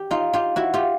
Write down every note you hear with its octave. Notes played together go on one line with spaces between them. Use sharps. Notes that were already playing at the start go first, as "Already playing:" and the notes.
Already playing: G4
D#4 F4
F4 G4
E4 F#4
F4 G4